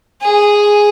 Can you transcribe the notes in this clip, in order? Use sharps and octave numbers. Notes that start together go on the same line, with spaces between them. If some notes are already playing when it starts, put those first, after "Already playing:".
G#4